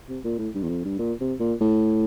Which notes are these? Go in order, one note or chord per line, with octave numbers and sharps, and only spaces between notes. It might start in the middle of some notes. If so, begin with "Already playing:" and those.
C3
A#2
A2
G2
E2
F2
G2
A#2
C3
A#2
A2